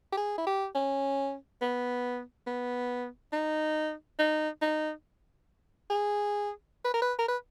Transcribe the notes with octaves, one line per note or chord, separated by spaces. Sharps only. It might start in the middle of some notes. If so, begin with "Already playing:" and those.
G4
G#4
E4
G4
C#4
B3
B3
D#4
D#4
D#4
G#4
B4
A#4
B4
A#4
B4